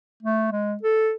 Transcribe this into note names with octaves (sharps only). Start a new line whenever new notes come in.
A3
G#3
A4